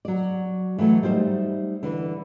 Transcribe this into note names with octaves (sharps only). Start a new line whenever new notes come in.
F#3 D5
E3 F#3 A3
G3 D#4 C5 E5
D3 E3